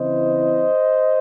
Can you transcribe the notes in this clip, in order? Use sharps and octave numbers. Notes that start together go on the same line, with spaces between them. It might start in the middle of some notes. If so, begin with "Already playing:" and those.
Already playing: C#3 E3 C4 E4 C5 D#5